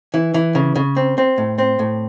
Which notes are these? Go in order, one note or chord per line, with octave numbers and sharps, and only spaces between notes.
E3
E3
C#3
C#3
C4
C4
A2
C4
A2